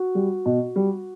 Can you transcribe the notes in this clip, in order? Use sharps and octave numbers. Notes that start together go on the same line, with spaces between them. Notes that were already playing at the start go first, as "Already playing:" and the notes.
Already playing: F#4
G3
B2
G3